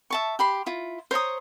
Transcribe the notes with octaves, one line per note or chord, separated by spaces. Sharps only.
E5 A5 C#6
G4 B5 C6
E4 F4
C5 C#5 A#5 D#6